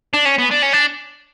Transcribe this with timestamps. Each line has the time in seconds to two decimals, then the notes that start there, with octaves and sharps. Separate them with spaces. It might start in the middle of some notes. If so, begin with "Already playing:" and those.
0.14 D4
0.26 C#4
0.39 B3
0.51 D4
0.63 C#4
0.73 D4